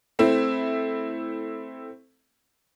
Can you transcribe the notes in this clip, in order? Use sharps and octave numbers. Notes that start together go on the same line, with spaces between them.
A3 C4 E4